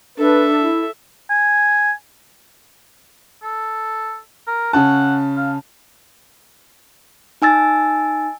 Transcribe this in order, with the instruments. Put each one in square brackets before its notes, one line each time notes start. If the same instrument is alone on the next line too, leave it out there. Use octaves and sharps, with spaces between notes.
[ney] D4 [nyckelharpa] A4 E5 [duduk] B4
[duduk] E4
[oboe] G#5
A4
A#4
[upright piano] C#3 C#4 A5 [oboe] F#5
[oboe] F5
[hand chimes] D#4 G#5 E6 A6